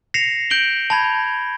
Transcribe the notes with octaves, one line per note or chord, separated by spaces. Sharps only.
A#6 C7 C#7 E7 F7
G6 D7 F#7 G7
A5 B5 G#6